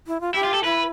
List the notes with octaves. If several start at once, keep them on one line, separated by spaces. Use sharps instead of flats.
E4
F4
E4 G4
F4
A4
E4 B4